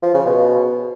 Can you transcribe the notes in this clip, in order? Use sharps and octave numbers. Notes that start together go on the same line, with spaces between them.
F3
C#3
B2